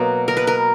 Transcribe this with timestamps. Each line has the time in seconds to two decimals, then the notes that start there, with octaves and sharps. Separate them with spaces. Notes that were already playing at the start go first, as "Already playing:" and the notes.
Already playing: B2 F#3 A#3 A#4
0.28 A#4
0.37 B4
0.47 A#4